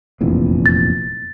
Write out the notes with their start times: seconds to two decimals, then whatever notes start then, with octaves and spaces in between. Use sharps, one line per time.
0.21 F1 A#1 E2
0.66 A6